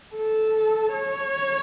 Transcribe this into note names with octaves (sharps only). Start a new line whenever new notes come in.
A4
C#5